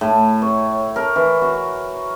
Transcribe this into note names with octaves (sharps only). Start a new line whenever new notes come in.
A2
C#5
A#4
E3
F#4